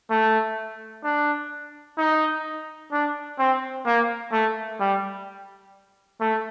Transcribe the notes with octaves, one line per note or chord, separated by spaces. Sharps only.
A3
D4
D#4
D4
C4
A#3
A3
G3
A3